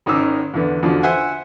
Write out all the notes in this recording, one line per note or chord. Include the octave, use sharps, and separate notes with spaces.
G#1 D#3 C#4 D#4 D6 E6
E2 D3 B3
E2 B2 D3 F3
C5 E5 F#5 G#5